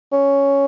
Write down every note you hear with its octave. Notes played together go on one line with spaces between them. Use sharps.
C#4